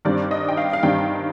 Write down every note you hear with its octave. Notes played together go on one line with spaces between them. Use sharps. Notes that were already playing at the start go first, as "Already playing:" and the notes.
G2 D#3 G3 C4 D5
D#5
G5
F5
F5
G2 D#3 G3 C4 G5